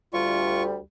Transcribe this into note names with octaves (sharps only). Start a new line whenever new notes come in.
D2 G3 F4 C#6